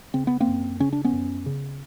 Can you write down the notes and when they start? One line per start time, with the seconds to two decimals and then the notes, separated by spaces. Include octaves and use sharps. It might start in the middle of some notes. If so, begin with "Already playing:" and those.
0.14 C#3 C4
0.27 B3
0.40 A#3 C4
0.48 F#2
0.80 C#3 C#4
0.93 D4
1.04 B3 C#4
1.13 F#2
1.46 C#3